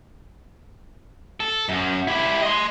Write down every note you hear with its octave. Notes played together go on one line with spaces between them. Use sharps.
A4
F#2
E4 G4
D#5 C6